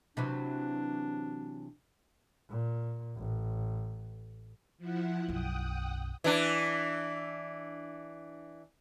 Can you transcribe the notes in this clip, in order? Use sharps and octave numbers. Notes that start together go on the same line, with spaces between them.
C3 E3 F#3 D4
A#2
A1
F3 E4 F#5
B1 F#2 F#5 G5 D#6
E3 D4